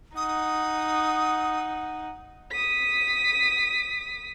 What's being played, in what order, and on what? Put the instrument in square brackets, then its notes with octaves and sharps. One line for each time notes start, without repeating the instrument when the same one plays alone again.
[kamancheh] D#4 F#5 [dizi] D#6
[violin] D#6 B6